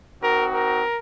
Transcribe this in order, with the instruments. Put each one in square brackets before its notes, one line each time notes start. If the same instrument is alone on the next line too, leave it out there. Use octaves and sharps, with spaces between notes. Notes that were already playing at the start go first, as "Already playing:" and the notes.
[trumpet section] C4 D#4 F#4 A#4
A#4